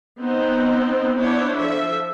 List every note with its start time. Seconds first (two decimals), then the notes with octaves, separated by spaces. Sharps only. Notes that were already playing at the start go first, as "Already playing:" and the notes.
0.20 B3 C4 D#4 C5
1.17 B3 D4 E4 C5 C#5
1.56 F3 A4 E5